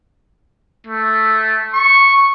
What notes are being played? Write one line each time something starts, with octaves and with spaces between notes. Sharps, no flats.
A3
C#6